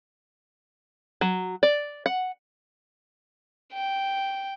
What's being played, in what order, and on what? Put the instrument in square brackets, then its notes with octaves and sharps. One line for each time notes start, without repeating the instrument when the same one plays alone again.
[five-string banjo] F#3
D5
F#5
[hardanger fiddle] G5